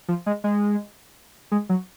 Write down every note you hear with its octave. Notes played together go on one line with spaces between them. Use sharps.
F3
G#3
G#3
G#3
F#3